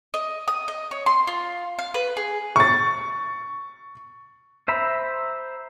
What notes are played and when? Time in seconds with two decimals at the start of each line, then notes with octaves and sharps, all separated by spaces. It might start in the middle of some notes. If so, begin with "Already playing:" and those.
0.14 D#5
0.48 D#6
0.68 D#5
0.91 C#5
1.06 C6
1.27 F4
1.79 F5
1.94 B4
2.17 G#4
2.56 C#6 A6
4.68 C5 E5 A#5 B5